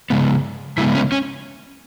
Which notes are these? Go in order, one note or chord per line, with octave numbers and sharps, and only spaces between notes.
C#3 G#3 B3
C#3 G#3 B3 E4
C#4
C#4